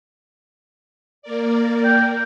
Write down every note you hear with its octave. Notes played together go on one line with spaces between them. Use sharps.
A#3 A#4 D5
G5